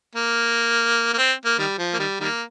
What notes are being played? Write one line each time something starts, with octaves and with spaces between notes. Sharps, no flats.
A#3
A#3
C4
A#3
D#3 G3
F3
A#3
D#3 G3
D#3 G3 A#3